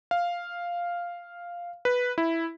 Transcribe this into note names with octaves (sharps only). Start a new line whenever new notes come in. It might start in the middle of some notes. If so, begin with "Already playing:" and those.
F5
B4
E4